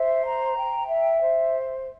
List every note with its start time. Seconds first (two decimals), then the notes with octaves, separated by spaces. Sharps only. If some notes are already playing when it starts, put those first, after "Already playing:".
Already playing: C5 E5
0.25 A#5
0.56 G5
0.88 E5
1.20 C5